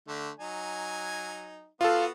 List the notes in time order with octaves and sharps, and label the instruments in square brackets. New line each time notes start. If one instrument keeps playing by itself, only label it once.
[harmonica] D3 A3
F#3 D#4 G#5
[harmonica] B3 F#4 [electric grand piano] F4 A4 [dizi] F5